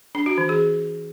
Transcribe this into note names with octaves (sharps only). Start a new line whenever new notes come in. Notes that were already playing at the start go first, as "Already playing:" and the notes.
D4
F#4
E3
G#4